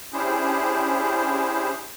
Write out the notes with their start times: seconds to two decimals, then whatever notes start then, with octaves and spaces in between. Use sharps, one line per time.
0.13 C#4 D4 E4 G4 G#4 C5